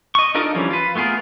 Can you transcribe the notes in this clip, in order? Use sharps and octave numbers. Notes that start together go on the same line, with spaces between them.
D#5 C#6
D4 D#4 F4 A4 A#4
E3 F3 G3 C#4
F4 B4
A3 B3 F4 G#4 A#4